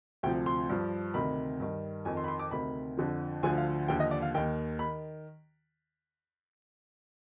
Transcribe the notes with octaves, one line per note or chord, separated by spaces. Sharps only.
D2 C3 F3 G5
C6
G2 F3
D2 C3 D#3 B5
G2 D#3
F2 D#3 G#5
C6
B5
C6
D6
D2 C3 D#3 B5
F2 D3 F3
D2 D3 F3 G#5
F5
D#2 D3 F3 G5
D#5
D5
F5
D#2 D#3 G5
D#3 B5